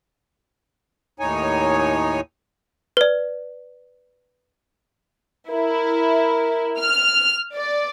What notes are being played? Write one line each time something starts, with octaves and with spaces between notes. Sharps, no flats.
D#2 A2 D#4 C#5 G#5
B4 D5
E4 A#4
F6
D5